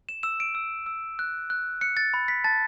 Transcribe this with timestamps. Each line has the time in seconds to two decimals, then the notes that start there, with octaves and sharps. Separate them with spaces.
0.09 E7
0.23 E6 E7
0.40 D7
0.55 E6
0.86 E6
1.19 F#6
1.50 F#6
1.81 F#6 C#7
1.97 A6
2.14 B5
2.28 B6
2.44 A5 A6